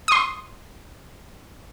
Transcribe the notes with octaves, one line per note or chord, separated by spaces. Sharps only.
C6 D#6